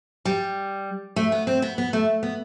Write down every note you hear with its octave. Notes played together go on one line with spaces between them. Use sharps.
G3
A3
B3
C4
B3
B3
A3
B3